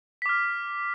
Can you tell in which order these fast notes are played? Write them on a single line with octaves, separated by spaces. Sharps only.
B6 D6 F6